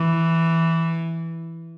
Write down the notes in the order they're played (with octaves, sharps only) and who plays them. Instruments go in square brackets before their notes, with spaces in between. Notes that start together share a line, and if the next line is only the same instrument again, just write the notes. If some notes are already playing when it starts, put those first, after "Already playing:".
Already playing: [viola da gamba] E3